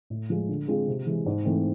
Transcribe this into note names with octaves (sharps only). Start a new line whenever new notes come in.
A2
F3 G#3
D3
G#3 C4 F4 G#4
C3
E3 G#3
G#2
E3 A3 C4